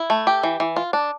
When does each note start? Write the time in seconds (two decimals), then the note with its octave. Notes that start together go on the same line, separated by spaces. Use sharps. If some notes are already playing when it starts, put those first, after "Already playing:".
Already playing: E4
0.10 A3
0.27 G4
0.43 E3
0.60 E3
0.76 F4
0.93 D4